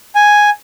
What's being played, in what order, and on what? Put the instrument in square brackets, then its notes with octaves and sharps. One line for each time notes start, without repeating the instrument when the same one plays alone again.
[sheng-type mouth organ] G#5